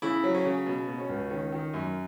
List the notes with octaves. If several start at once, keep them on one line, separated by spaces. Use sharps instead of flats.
C#3 E4
F#3
C#4
C#3
B2
B2
C#4
C#2
D#3 C#4
D#3
F#2